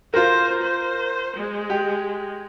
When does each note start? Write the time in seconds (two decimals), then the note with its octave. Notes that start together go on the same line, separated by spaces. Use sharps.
0.14 F4 A#4 C5
0.63 C5
1.36 G#3
1.70 G4